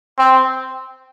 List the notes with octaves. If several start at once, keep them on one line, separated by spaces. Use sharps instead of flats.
C4